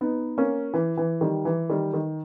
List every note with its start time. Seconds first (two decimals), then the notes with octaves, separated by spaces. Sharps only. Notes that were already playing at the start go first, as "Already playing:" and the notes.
0.01 B3 D#4
0.38 A#3 C#4
0.74 E3
0.98 E3
1.21 D#3 G3
1.45 E3
1.70 D#3 G3
1.94 D#3